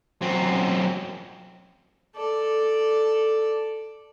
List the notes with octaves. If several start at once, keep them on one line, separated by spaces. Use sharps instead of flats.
F#2 C4
A4 D5